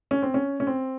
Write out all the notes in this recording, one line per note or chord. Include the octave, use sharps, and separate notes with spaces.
C#4
C4
C#4
C#4
C4